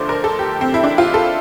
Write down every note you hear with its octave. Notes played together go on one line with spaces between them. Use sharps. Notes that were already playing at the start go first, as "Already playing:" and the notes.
Already playing: F2 D3 F3 A3 C5 D5
A#4
A4
G4
C4
E4
D4
F4
A4